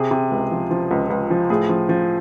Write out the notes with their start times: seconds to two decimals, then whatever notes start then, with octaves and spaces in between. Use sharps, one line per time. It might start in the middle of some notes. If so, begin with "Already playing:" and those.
Already playing: C3 G#4
0.11 C3
0.31 C#2
0.51 F3
0.71 F3
0.91 C#2
1.10 C#2
1.30 F3
1.50 A2 G#4
1.69 F3
1.89 F3